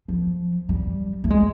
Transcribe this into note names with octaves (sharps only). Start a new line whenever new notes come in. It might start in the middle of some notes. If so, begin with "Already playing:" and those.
F3
G3
A3
G#3